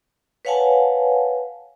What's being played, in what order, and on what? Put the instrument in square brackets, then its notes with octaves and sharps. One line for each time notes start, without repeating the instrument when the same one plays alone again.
[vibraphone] B4 C#5 F5 F#5 G#5 A5